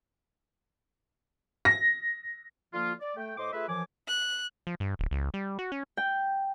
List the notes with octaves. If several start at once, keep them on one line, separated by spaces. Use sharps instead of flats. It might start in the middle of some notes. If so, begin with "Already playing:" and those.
A#6
D3 F3 A#3 F4
D5
A3 G5
A2 C5 D#5 C6 D6
A3 F4 G#4 B4 E5
F#2 E3 F3 G#5 D6
F#6
F3
G2
D1
C#2
G3
F#4
C#4
G5